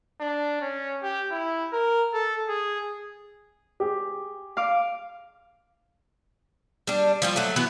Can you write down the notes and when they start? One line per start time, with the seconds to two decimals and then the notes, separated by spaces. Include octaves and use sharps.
0.21 D4
0.61 C#4
1.03 G4
1.31 E4
1.72 A#4
2.14 A4
2.48 G#4
3.80 G4 G#4
4.57 F5 D6
6.87 G3 D4
7.22 F3 G3 F4
7.36 F#3 A3
7.56 E3 B3 F#4 B4